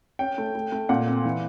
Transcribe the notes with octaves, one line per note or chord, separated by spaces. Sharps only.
C#4 G5
A3
A3
A3
A#2 F#5
C4
E3